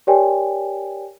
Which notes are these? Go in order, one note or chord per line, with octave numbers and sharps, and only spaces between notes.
G4 A#4 C#5 D5 G5 G#5